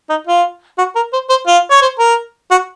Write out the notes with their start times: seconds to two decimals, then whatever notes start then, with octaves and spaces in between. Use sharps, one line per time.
0.10 D#4
0.27 F4
0.78 F#4
0.95 A#4
1.13 C5
1.29 C5
1.47 F4
1.70 C#5
1.82 C5
1.99 A#4
2.51 F#4